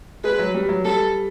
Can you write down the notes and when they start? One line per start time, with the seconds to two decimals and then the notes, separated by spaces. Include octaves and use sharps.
0.24 G#3 B4
0.39 F#3
0.54 G3
0.69 F#3
0.85 G3 A4